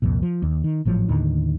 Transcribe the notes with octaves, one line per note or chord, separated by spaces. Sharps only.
C2 F2 A#2
F3
D#2
D#3
G#1 A2 F3 F#3
D#2 A2 D3 D#3